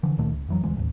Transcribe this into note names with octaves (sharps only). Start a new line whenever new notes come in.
D3 E3 F3
C#2 A#2 D#3 A3
C#2
F2 E3 F#3
E1 D2 E3 G#3
A1 D#2